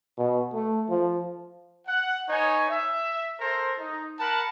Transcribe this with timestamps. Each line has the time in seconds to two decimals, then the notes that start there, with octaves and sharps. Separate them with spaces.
0.18 B2
0.54 A3
0.89 F3
1.87 F#5
2.29 D#4 B4 C#5 G#5
2.70 E5
3.40 A4 A#4 C5
3.79 D#4
4.20 A#4 F#5 A5 B5